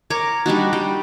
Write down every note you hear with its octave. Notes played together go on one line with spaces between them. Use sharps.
A#4 C#5 C#6 D6
G3 D4 D#4 F#4
G3 G5